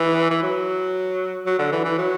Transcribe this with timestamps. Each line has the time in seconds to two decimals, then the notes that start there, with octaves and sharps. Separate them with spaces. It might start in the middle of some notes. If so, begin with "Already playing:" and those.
Already playing: E3
0.31 E3
0.43 F#3
1.46 F#3
1.59 D3
1.72 E3
1.85 E3
1.98 F#3